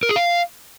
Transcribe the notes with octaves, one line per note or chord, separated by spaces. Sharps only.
A#4
G#4
F5